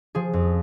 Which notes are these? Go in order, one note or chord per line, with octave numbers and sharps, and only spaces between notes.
F3 G#4
F2